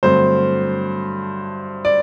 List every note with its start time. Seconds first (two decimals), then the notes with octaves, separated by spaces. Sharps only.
0.03 G2 D3 F#3 A3 C4 C5
1.85 D5